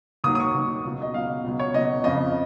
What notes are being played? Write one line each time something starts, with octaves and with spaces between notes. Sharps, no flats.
D#2 D#3 F#3 D#6
D#6
C#6
D#2 D#3 F#3
C#2 B2 F#3
D#5
C#2 B2 F#3 F5
C#2 B2 F#3
C#5
C#2 B2 F#3 D#5
F2 C#3 F3 D#5